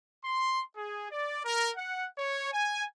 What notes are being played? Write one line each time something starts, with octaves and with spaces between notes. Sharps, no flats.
C6
G#4
D5
A#4
F#5
C#5
G#5